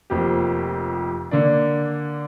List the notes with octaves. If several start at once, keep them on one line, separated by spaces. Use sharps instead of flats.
F1 F2 F3 A#3 G4
D3 A#3 D4